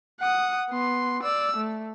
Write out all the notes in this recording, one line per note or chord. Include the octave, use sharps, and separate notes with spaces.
F#5 D#6
B3 C6
D5 E6
A3